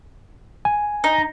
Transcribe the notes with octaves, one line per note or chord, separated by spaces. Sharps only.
G#5
D#4